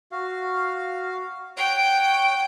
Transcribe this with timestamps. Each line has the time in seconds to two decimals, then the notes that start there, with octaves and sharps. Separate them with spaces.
0.12 F#4 F5
1.57 C#5 F#5 G5